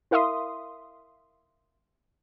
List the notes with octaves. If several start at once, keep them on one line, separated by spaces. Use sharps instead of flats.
E4 A#4 E5 F5 C6 D#6